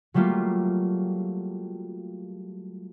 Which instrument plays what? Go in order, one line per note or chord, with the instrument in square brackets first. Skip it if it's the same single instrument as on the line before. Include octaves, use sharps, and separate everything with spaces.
[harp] F#3 G3 A3 A#3 F4